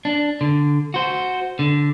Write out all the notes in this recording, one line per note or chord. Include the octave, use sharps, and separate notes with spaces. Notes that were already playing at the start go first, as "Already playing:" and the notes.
D4
D3
F#4 C5
D3